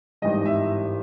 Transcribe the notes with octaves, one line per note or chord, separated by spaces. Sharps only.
G#1 G2 E3 G3 D#5
E5